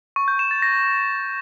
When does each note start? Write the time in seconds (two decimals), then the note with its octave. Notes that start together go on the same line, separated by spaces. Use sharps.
0.16 C#6
0.28 G6
0.39 E7
0.51 A6
0.62 A#6